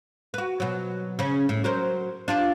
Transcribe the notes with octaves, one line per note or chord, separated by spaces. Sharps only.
F#4 B4
B2 F#3
C#3 C#4
A2
F#3 A#4 C5
D4 F4 G4